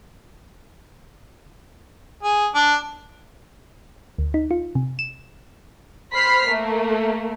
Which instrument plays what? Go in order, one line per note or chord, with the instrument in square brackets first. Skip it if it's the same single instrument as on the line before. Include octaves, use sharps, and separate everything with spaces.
[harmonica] G#4
D4
[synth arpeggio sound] D2
D#4
F4
C3
E7
[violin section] C5 B5 F6 B6 C7
A3 A#3